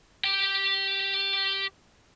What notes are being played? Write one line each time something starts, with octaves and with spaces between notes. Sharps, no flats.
G4 G5